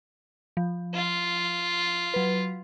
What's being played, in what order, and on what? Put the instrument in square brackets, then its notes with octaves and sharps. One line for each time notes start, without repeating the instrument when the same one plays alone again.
[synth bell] F3
[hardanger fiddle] F4
[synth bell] F#3 B4